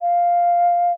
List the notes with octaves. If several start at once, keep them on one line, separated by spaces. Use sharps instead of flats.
F5